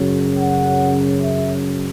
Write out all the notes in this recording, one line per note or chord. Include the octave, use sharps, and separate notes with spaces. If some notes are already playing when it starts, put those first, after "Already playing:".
Already playing: F#2 C#3 F#3
F#5
E5